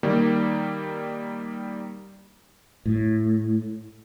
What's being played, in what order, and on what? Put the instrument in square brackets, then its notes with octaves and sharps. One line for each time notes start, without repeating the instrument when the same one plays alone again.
[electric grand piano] D#3 G3 A#3
[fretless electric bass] A2